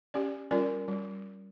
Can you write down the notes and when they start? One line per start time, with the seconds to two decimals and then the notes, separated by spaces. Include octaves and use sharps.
0.14 C#4 G4 D5
0.51 G3 C#4 F4 A#4 D5
0.88 G3